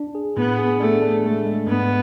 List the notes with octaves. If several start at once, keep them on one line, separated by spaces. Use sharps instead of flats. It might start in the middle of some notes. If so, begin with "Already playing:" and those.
Already playing: D4
G#4
A2 B3
G#4
A3 D4
D4
G#3 A3
G#3
G#2 B3